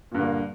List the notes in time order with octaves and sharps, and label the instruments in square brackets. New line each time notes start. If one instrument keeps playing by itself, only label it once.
[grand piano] A#2
G2
D3
A#3